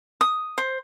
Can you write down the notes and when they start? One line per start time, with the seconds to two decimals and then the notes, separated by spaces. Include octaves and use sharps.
0.21 D#6
0.58 C5